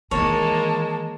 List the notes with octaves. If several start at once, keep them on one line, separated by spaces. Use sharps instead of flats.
D#3 E3 G#3 A#3 C#5 A5